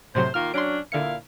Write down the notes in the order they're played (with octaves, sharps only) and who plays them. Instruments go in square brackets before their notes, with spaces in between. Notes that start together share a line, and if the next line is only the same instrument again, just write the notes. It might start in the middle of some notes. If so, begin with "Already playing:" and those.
[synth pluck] A2 C3 F#3 [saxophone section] C5
[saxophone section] D#3 A#3 F4 [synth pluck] F6
[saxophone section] F#3 C#4 D4 [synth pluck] C6 D7
[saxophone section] A#2 E4 F5 [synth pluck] D3 C#7